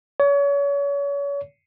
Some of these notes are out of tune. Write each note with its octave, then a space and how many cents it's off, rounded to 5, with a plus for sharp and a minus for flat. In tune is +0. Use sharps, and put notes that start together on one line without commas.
C#5 +35